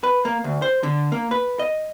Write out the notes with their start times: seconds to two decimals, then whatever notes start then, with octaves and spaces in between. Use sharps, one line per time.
0.03 B4
0.25 A#3
0.44 D2
0.62 C5
0.83 D3
1.12 A#3
1.31 B4
1.59 D#5